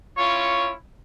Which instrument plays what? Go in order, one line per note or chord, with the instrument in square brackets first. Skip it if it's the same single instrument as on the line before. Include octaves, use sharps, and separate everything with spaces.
[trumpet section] C#4 E4 F4 C#5 C#6